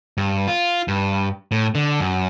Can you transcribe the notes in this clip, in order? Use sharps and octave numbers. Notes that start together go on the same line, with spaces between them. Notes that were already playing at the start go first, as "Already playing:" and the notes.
G2
F4
G2
A2
D3
F#2